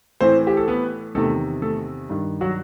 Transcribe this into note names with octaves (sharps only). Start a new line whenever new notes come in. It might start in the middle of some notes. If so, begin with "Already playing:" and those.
A2 E3 C4 C5
G4
A4
B3 B4
E2 C3 D#3 A3 A4
A3 A4
G2 D#3
F#3 F#4